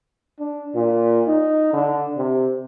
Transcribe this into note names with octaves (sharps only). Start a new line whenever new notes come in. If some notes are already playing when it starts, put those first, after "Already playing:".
D4
A#2
D#4
D3
C3